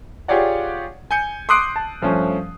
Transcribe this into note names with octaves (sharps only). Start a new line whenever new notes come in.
F4 G4 G#4 C#5 D5 F#5
G#5 G6 C#7
C6 D6 D#6 F#6 C7 D7
A5
G2 F3 A3 C#4